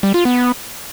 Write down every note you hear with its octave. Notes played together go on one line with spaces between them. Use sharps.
G3
F4
B3